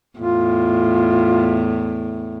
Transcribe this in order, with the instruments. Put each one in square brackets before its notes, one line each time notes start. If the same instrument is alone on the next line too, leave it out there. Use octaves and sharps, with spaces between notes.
[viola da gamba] E2 A2 [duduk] F4